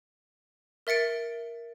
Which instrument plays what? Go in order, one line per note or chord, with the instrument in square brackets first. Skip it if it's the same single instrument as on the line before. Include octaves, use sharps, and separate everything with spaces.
[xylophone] A#4 E5 A6 C#7 D7